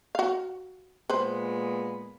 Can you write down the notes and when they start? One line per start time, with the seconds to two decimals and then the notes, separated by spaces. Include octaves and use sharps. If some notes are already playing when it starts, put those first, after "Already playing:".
0.15 F#4 F5
1.09 A#2 G#3 B3 B4 C5